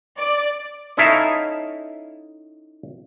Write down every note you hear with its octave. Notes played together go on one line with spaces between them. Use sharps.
D5
C#4 D#4 E4 A4 E5 F5